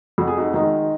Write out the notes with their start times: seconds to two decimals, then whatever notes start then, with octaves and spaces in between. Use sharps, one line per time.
0.18 F2 F#4
0.27 G#4
0.37 D#4 F#4
0.54 D#3 D#4 F#4
0.59 G#3